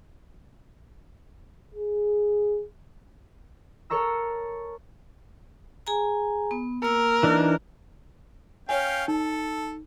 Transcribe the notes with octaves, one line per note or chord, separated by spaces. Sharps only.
G#4
A4 A#4 C#5 A#5 E6
G#4 G#5 A#5
B3
A#3 A#4 E6
E3 D4 D#4
C#4 C#5 F5 G5 G#5
D#4 A4